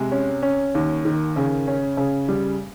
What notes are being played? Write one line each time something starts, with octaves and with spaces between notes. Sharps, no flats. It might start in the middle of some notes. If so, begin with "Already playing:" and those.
Already playing: C3 G#3
C#4
C#4
D#2
D#3
C#3
C#4
C#3
G3